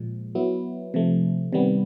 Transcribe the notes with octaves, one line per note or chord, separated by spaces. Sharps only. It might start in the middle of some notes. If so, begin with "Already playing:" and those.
Already playing: A#2 F3 G#3
F#3 B3 E4
C3 F3 A3
C3 D#3 G3 B3